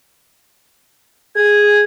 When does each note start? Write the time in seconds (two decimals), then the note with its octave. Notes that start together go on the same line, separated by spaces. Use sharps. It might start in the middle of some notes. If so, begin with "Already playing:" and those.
1.36 G#4 G#6